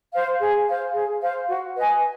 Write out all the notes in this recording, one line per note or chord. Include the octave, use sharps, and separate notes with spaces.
C5 F5
G#4
C5 F5
G#4
C5 F5
F#4
B4 D#5 G#5